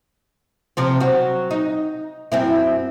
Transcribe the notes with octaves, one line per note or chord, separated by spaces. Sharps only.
C3 F3 C4
F#3 F#4
D#4
F#2 C4 E4